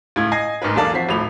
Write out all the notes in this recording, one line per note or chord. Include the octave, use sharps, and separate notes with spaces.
C#2 A2 E4 G#6
D#5 G#5 G#6 A#6 C7
A1 G#2 G#3 A#4 B4
B1 E2 A#3 A4 D5 A5
F3 C4 F#4 B6 C7
D#1 G#1 A2 B5 F7